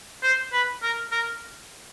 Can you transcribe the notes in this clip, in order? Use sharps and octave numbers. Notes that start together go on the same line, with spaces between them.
C5
B4
A#4
A#4